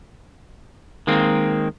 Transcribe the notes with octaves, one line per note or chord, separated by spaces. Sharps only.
D#3 G#3 A#3 C4